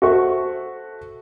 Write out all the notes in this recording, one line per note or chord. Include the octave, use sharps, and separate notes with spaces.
F#4 A4 C5 E5 C#6